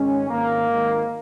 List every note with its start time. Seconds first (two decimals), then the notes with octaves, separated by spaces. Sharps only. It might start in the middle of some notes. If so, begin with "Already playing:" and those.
Already playing: G#1 G#2 D#3 G#3 C#4
0.29 G#1 G#2 D#3 A#3
0.67 G#1 G#2 D#3